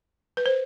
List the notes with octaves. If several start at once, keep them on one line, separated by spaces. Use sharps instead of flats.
B4
C5